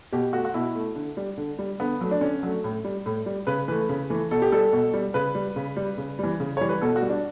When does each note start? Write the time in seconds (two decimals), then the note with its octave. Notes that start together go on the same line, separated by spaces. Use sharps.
0.13 B2 G4
0.33 A3 F#4
0.45 F#4
0.54 B2 E4
0.75 A3
0.96 D3
1.17 G3
1.38 D3
1.59 G3
1.80 D3 B3
2.01 F#3 A3
2.11 D4
2.21 D3 C#4
2.43 F#3 A3
2.64 A2
2.84 G3
3.06 A2
3.26 G3
3.47 C#3 B4
3.68 E3 A3 B4
3.89 C#3
4.10 E3 A3
4.31 B2 A4
4.42 G4
4.52 G3 A4
4.73 B2
4.94 G3
5.14 C#3 B4
5.35 G3
5.56 C#3
5.77 G3
5.98 C#3
6.19 E3 G3
6.40 C#3
6.57 E3 G3 C#5
6.69 B4
6.81 B2 A4
6.96 F#4
7.02 G3
7.10 D4